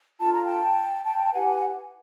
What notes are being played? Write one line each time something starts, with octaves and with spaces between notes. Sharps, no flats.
D4 F4 A4 A5
A#5
G5 A5
G5 A5
E4 G4 B4 F#5 G#5